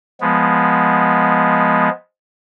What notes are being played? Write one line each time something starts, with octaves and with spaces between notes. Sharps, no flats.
F3 G#3 B3